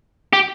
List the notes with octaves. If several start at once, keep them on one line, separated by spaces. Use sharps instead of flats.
G4